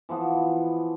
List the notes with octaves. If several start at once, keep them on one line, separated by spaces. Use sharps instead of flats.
E3 F3 B3